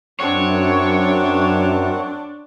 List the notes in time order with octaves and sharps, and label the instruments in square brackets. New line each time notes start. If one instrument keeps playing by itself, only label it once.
[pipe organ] F#2 [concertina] C4 F#5 [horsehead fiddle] D4 [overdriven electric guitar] C#5